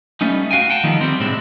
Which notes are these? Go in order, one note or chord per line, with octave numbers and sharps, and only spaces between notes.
G3 A3 B3 C#4 D#4
F#4 F5 G5 G#5
F#5 G5 A5
D#3 F3 G3 A3 B3 D#4
G3 B3 C4
A2 C3 G#3 C4 D4 E4